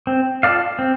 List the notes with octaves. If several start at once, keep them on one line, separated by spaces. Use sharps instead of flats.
C4
F4 A4 D5 F5
C4